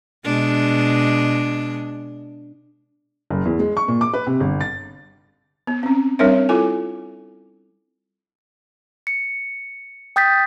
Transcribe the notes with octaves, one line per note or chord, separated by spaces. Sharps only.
B2 G#3 D4
F#1
E2
G#3
C#6
A#2
D6
B4
C3
G1
A6
B3
C4 C#4
G3 C4 D4 A#4 C#5 E5
E4 F4 A4 G#5
C#7
G5 D#6 G6 A6 B6